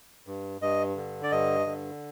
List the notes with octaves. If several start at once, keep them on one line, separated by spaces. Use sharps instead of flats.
G2
G2 D#5
D3
D5
G2 D#5
D3